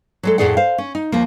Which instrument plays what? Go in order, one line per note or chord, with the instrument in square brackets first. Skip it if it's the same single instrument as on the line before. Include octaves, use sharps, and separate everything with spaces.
[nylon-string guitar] F#3 G#3 A4
F2 A2 F3 G#4 D5 F#5
C5 F5
C#4
D#4
D#2 F3 A#3